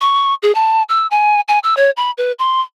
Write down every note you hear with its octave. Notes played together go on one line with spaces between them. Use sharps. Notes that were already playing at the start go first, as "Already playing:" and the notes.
C#6
G#4
A5
E6
G#5
G#5
E6
C#5
B5
B4
C6